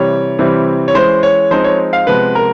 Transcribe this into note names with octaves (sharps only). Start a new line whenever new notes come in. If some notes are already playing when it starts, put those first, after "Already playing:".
Already playing: C3 E3 G3 C#5
C3 E3 G3 C4
C#5
E3 G#3 C#4 C5
C#5
F3 G#3 C4 D#4 C5
C#5
F5
C3 F3 G#3 B3 B4
A#4